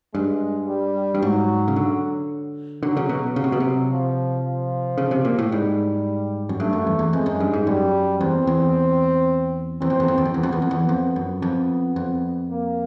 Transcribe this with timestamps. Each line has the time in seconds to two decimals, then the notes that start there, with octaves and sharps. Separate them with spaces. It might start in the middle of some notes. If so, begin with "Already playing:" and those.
0.14 G2 G#3
0.68 G3
1.15 G2
1.22 G#2 F#3
1.68 C#3
1.76 D3
2.83 D3 F#3
2.97 C#3
3.09 B2
3.36 C#3 F#3
3.44 C3
3.52 B2
3.60 C3
3.90 F3
4.44 F3
4.98 C#3
5.11 C3
5.25 A#2
5.39 A2
5.51 G#2 G3
6.49 F#2
6.60 G2 A3
6.73 F#2
6.87 E2
6.99 E2
7.13 F2 G#3
7.26 F#2
7.40 G2
7.53 G#2
7.67 F#2 G3
8.20 E2 C4
8.47 E2
9.81 E2 C4
9.90 F2
10.00 E2
10.08 F2
10.18 E2
10.25 F2
10.34 E2 B3
10.43 F2
10.52 E2
10.62 F2
10.71 E2
10.89 F2
11.16 F#2
11.42 F2 B3
11.96 F2
12.50 A#3